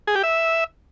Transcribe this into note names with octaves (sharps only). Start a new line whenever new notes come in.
G#4
G4
E5